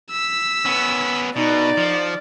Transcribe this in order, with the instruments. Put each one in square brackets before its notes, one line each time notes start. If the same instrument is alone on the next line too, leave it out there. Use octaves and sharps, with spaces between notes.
[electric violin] E6 B6
[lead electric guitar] B3 C#4
[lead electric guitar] B2 [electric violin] D#4 [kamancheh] D5
[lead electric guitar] F3